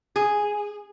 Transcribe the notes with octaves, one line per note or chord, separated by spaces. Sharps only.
G#4